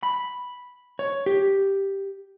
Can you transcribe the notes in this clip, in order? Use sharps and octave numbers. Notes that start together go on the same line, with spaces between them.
B5
C#5
G4